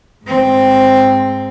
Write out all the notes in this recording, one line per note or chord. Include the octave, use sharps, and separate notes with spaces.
G#2 C4